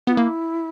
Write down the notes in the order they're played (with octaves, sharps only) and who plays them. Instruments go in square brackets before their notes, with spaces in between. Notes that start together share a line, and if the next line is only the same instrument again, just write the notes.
[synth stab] B3 [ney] F#4
[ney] E4
[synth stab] A#3